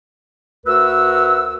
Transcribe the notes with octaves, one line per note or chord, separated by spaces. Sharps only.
D2 F#4 A#4 B4 E6